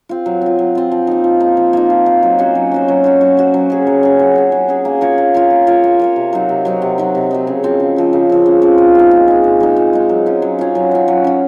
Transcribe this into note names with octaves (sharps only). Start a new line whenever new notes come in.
C4 F4
F#3
C4 F4
F#3
C4 F4
F3
A#3 D#4
F3
A#3 D#4
F3
A#3 D#4
F3
A#3 D#4
F#3
C#4 F#4 C5
F#3
C#4 F#4 C5
F#3
C#4 F#4 C5
F#3
C#4 F#4 C5
F#3
C#4 G#4
F#3
C#4 G#4
F#3
C#4 G#4
F#3
C#4 G#4
A#3
F4 A#4 C#5
A#3
F4 A#4 C#5
A#3
F4 A#4 C#5
A#3
F4 A#4 C#5
C3
F#3 C4 D#4
C3
F#3 C4 D#4
C3
F#3 C4 D#4
C3
F#3 C4 D#4
C#3
F3 C4
C#3
F3 C4
C#3
F3 C4
C#3
F3 C4
A#2
G#3 D#4
A#2
G#3 D#4
A#2
G#3 D#4
A#2
G#3 D#4
F#3
C#4 F4
F#3
C#4 F4
F#3
C#4 F4
F#3
C#4 F4